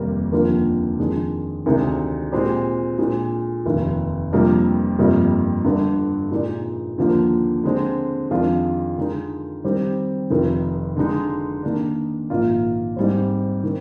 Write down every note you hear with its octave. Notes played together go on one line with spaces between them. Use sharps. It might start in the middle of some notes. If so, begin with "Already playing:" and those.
Already playing: F1 D#2 D#3 G3 A#3
F1 D#2 D3 F3 A#3
F2 D#3 G#3 D4 G#4
D2 C3 D#3 G#3 D#4
A#2 G#3 C4 G4
A#2 G#3 D4
F1 D#2 D#3
F2 C3 G3 A#3 D4
G1 F2 C3 G3 A#3
G1 G2 D3
A#2 G#3 D#4 A#4 D5
D#2 D3 F3 A#3
D3 G#3 C4
F2 D#3 G#3 D4 F4
D3 G#3 D#4 A#4
D#3 G3 C4 G4
F1 F2 D#3
D3 G#3 D#4
D#3 A#3 D4
A#1 G#2 D#3 A#3 F4
G#2 G3 C4
D#3